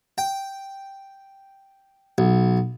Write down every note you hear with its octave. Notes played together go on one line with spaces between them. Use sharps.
G5
B1